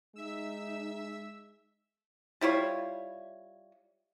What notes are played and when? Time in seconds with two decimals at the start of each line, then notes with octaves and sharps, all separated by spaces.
0.16 G#3 D#4 E5 E6
2.41 G3 E4 F4 C#5